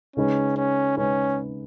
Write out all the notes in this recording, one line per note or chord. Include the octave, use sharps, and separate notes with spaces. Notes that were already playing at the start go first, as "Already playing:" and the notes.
C#3 G#3 C#4 D#4 G#4 B4
C#4
C#3 G#3 C#4 D#4 G#4 B4